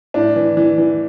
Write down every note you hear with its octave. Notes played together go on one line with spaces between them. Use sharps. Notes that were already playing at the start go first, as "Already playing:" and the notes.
A2 D4
E3
E3
E3